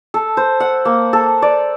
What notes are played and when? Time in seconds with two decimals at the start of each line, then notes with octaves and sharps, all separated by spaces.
0.14 A4
0.37 C5
0.60 F#5
0.85 A#3
1.13 A4
1.42 D5